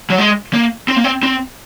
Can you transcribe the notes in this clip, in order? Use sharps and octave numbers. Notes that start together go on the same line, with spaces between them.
F#3
G#3
A#3
C4
A#3
C4
C4